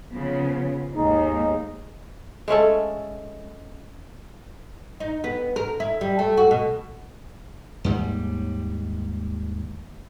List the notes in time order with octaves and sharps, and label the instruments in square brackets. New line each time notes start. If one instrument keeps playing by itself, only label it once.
[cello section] C#3 F3 B3
[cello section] D#2 G#2 A#3 [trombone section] G#3 D#4
[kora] G#3 A3 C#4 A4
[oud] D#4
B3
A#4
E4
G3
A3
F#4
B2
[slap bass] D#2 G#2 G3